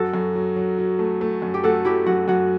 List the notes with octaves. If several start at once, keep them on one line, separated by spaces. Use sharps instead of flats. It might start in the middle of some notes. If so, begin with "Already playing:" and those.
Already playing: F#2 F#4 A4
F#2
F#3
F#3
F#3
A3
A3
F#2
G4
A3 F#4 A4
F#3 E4 G4
F#2 F#4
F#2 F#4